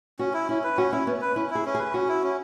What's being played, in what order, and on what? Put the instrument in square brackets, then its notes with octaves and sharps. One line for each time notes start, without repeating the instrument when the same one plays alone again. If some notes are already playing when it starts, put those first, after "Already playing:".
[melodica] C#4 [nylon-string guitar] F#4
[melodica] E4
[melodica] C#4 [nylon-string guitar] E4
[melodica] B4
[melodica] C#4 [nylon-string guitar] F#4
[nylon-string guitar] C#4 [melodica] E4
[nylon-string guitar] B3 [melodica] C#4
[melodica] B4
[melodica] C#4 [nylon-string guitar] E4
[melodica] E4
[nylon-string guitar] G#4
[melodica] C#4
[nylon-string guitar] G#4
[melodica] B4
[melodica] C#4 [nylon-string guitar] F#4
[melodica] E4
C#4